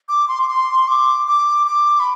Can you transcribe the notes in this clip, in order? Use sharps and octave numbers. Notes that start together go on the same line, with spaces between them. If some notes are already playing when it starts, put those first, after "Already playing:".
D6
C6
D6
C6
D6
D6
D6
B5